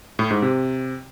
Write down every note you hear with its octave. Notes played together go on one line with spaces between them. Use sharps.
A2
G#2
C3